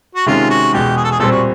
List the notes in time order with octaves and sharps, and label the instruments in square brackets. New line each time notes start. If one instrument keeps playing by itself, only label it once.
[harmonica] F#4
[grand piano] C3 D#3 G#3 C#4 [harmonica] F4
[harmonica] F#4
[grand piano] E2 B2 G#3 [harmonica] G4
[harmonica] G#4
A4
G#4
[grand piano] A#2 G3 C4 [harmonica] A4
[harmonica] F#4